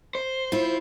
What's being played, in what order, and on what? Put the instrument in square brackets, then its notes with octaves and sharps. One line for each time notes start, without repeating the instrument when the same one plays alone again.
[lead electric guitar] C5
[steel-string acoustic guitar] E4 F4